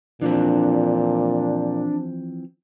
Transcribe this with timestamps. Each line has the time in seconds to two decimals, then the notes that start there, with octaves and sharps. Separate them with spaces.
0.22 A#2 E3 F3 C4 D4